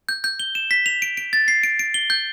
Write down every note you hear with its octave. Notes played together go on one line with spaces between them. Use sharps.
G6
G6
G7
E7
B6
F7
D7
D7
A6
C7
D7
D7
G7
G6